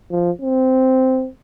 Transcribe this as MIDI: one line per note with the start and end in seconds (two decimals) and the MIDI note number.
0.11 0.31 53
0.42 1.28 60